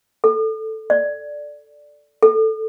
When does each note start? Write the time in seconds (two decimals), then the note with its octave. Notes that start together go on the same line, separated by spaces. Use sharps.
0.24 A4
0.90 D5
2.23 A4